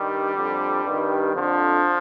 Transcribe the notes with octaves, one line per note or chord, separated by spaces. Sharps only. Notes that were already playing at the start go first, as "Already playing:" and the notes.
Already playing: G2 D#3 G3
F2 D3
G2 D#3
F2 D3 F3